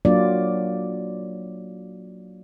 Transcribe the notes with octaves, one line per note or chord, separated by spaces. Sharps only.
F#3 A#3 D4 F4 D5